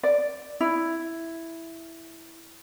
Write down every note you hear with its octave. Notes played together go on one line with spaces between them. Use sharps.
D5
E4